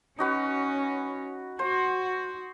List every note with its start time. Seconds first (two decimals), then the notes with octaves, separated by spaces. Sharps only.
0.19 C#4 D#4 F#4 B4
1.59 F#4 C5